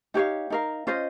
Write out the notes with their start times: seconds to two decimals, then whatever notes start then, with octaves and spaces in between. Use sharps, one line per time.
0.14 D#4 G4 C#5 F5
0.50 D#4 A#4 F5
0.87 C#4 F4 C5 D#5